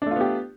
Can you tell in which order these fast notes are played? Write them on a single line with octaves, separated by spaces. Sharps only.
D4 A3 F4 B3 G4